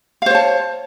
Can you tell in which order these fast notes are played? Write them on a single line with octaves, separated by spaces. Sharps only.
F5 C5 C#5 A5